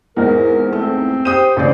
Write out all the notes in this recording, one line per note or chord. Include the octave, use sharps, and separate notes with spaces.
G#1 E2 A#4
A3 C4
G4 C5 G5 D#6 D#7
A1 D2 C#3 C5 D5